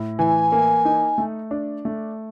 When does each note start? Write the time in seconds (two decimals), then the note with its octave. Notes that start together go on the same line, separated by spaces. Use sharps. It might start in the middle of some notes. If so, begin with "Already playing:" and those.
Already playing: A2
0.19 E3 G#5
0.52 A#3
0.85 D#4
1.18 A3
1.51 D4
1.85 A3